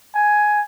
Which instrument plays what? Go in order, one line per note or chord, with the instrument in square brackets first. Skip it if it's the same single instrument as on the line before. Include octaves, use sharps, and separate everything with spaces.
[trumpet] G#5